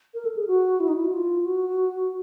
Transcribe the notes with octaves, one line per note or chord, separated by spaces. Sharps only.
A#4
A4
G#4
F#4
E4
D#4
E4
F#4
F4
F#4